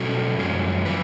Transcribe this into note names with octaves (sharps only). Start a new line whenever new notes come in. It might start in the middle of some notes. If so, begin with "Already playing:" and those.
Already playing: B2 F#3 C#4 F#4 A4
F#2 F3 G#3 C#4
F3 B4